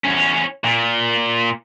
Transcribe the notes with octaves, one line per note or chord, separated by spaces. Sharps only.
E2 C#4
A#2